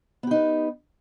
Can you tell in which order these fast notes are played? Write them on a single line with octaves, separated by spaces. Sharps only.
B3 G4 D#4 B4